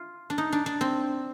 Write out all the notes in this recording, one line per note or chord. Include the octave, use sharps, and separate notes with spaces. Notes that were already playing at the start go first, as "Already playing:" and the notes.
Already playing: F4
D4
D#4
D4
D4
C4